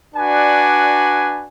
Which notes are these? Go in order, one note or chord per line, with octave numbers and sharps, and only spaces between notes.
D4 F#4 B4 D5 G#5